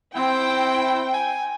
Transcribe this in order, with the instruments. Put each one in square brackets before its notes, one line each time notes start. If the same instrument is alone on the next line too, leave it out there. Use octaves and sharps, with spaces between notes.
[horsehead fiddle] C4 [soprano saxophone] E4 [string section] G5
[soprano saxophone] G#5